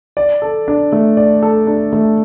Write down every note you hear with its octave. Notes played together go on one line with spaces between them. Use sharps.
D5
A4
D4
A3
D5
A4
D4
A3